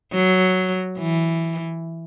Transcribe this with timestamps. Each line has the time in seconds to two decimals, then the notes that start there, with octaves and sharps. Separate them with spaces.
0.13 F#3
0.98 E3